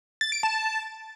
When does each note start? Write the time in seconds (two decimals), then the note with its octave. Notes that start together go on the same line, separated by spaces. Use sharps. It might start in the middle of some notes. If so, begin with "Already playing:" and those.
0.21 A6
0.32 D7
0.43 A5